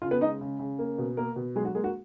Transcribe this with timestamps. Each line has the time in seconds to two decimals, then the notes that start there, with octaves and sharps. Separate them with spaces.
0.02 C#3 F4
0.11 B3 B4
0.21 G#3 D#4 D#5
0.41 C#3
0.59 C#3
0.79 A#3
0.98 B2
1.17 A#3 A#4
1.36 B2
1.56 F#3 G#3 G#4
1.65 F#4
1.75 G#3 A#3 G#4
1.84 F#4